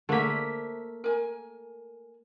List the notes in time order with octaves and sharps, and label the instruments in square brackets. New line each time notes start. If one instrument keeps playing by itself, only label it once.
[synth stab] D3 B6 [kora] A3 A#3 [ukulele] A#4 C5 E5
[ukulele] A#4 G#5